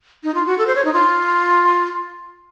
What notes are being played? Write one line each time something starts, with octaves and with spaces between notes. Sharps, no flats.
D#4
F4
F#4
A4
C5
C#5
D#4
F4